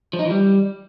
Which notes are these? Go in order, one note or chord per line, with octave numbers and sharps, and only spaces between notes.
F3
D#4
E3
G3